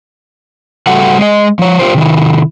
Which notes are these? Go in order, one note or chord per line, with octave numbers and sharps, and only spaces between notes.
C#3 G3 A3 F#4 A4 F#5
G#3 D#5
F3 C#5
F4 G4 A#4 C5
C3 D#3 E4